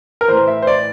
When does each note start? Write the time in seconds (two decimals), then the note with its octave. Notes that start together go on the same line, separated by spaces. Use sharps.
0.21 A#4
0.28 A2 E3 C5
0.48 E5
0.62 C5
0.67 D5